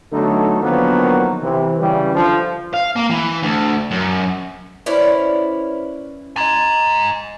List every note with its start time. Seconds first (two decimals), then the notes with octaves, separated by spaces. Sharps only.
0.13 D3 F#3 A3 B3 D#4 A4
0.62 D3 D#3 F3 F#3 A#3 B3
1.42 C3 E3
1.80 C#3 E3 G3
2.15 D3 F3
2.74 F5
2.96 A#3
3.10 E3
3.42 D2
3.91 F#2
4.86 C#4 E4 B4 C5 D5 B5
6.36 D#5 G#5 A#5 G#6 A6